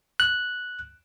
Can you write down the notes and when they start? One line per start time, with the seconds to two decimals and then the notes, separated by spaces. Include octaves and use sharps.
0.20 F#6